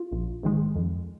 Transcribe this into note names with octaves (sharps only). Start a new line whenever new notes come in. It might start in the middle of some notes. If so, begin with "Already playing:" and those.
Already playing: F4
A#1
G#2 D#3 G#3
F2